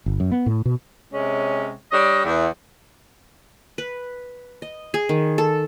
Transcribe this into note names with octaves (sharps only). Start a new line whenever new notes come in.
G1
F#2
B3
A2
B2
C3 G#3 C#4
G3 D4 C#5 D#5
E2
B4
D#5
G#4
D#3
A4